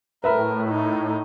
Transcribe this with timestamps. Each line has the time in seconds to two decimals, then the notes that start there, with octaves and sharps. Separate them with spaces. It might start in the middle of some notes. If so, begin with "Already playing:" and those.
0.24 A2 A#4 B4 E5 B5
0.68 D#4